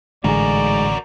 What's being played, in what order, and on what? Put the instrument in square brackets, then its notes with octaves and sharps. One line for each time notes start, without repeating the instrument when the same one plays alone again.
[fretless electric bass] A1 D3 [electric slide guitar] G#2 G#4 [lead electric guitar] F#4 A#4 [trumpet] D5